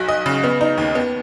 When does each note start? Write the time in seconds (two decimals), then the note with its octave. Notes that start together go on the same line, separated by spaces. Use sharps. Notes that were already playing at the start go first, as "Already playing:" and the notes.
Already playing: B1 F#4
0.08 D#5
0.26 C#3
0.44 B3
0.61 D#4
0.78 D#2
0.95 B3